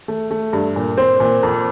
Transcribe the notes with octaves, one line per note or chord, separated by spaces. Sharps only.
A3
A3
G2
A#2
C4
A#2
F2